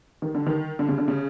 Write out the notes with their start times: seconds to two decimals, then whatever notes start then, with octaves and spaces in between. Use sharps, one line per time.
0.22 D#3
0.35 D3
0.46 D#3
0.79 D3
0.89 C#3
0.98 D3
1.08 C#3